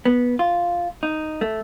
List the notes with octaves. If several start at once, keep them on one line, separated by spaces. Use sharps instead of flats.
B3
F4
D#4
A3